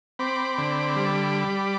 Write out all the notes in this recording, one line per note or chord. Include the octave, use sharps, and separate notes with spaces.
C4 B5 D6
D3
G3